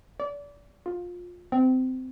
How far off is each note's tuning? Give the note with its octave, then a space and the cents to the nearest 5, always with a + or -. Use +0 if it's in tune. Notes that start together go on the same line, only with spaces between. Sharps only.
D5 -30
F4 +20
C4 -25